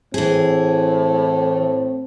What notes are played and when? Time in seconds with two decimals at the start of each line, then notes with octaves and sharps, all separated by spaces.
0.14 A2 E3 C4 G#4